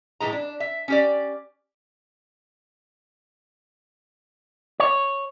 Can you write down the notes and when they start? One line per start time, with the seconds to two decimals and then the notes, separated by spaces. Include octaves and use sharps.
0.20 A2 E3 G#3 A#5
0.33 D4
0.60 E5
0.88 C#4 G4 D5
4.80 C#5